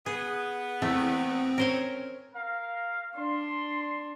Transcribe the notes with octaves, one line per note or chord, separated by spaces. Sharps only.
B3 G#4
E2 E3 A3 C4
C#4 A#4 C5 C#5
A#4 F5
D4 C6